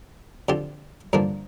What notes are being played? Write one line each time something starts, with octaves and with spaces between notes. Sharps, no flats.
D3 F3 C4 G4
G2 D3 F3 A#3 D4